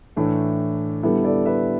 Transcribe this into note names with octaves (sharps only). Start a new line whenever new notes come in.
A2 E3 A3 D4
D3 G3 B3 E4 A4
A4 D5
B4 E5